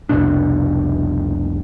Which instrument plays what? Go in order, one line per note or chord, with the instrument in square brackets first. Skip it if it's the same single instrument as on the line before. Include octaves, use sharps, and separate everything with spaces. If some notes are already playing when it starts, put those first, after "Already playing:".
[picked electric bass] F1 C2 B2 D4